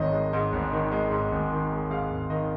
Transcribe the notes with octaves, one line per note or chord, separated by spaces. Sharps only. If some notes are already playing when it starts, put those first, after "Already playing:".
Already playing: G#1 G#2 D#3 C#5 D#5
G#3
G#2 D#5
G#1
D#3
G#3
G#2
G#1
D#3
G#3
G#2 F5
G#1
D#3 D#5